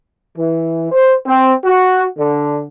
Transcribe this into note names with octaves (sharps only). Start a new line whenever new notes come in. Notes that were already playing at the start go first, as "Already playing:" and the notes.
E3
C5
C4
F#4
D3